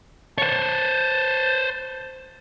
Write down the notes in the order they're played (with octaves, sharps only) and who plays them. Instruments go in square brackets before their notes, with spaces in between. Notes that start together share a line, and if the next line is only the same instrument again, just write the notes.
[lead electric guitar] C5 C#5 [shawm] A5